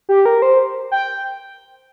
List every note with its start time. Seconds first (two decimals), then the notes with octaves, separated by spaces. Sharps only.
0.09 G4
0.26 A#4
0.42 C5
0.91 G5